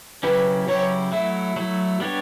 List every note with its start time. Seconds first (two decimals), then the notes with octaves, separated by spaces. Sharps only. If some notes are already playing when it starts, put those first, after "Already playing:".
0.23 C#3 F#3 C#4 E4 G4 B4
0.68 C#3 F#3 C#4 E4 G4 C#5
1.12 F#3 A3 E4 E5
1.56 F#3 A3 E4
2.00 G3 B3 D4 G4 C#5